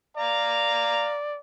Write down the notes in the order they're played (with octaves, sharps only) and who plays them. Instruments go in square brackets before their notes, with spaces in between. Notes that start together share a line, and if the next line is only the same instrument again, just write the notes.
[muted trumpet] D5 [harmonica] F5 A#5